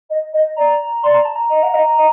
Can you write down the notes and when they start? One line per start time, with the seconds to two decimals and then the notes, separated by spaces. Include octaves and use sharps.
0.10 D#5
0.33 D#5
0.56 D5 A#5
1.03 D5 C6
1.14 A#5
1.25 A5
1.36 A#5
1.50 D#5
1.62 F#5
1.73 D#5
1.97 D#5